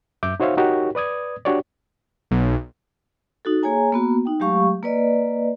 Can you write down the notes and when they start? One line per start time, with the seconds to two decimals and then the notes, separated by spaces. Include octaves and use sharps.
0.23 F#2 E5 D6 G6
0.40 D#4 F#4 C5 C#5 E5 F5
0.57 D#4 F#4 G4 A#4 C#5
0.95 B4 D5 D#6 G#6
1.45 D4 F#4 G4 C#5 D5
2.31 B1
3.45 D#4 F#4 A4
3.63 A#3 G#4 C#5 G#5 A#5
3.92 A#3 B3 F#4
4.25 D#4 G5
4.40 F#3 G#3 A3 G4 F5 C#6
4.83 A#3 B4 D5 D#5